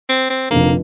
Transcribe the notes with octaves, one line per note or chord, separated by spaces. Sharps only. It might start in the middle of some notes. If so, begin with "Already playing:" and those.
C4
C4
F1 F2 D3 F3 A#3